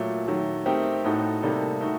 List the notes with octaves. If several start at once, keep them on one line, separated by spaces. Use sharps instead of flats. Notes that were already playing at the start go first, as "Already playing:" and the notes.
Already playing: A#2 F#3 A3
D#3 F#3 A3
A3 C4 D#4 G4 A#4
A2 A3 D#4 F#4 A4
C3 G3 A#3 D#4 A4
A3 D#4 F#4